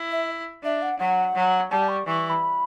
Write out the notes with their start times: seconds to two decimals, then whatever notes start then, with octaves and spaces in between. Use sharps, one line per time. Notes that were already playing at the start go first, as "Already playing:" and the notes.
Already playing: E4
0.11 E5
0.63 D4 E5
0.82 F#5
0.99 F#3 F#5
1.35 F#3
1.71 G3 A5
1.88 C#6
2.06 E3 C#6
2.24 C#6
2.29 B5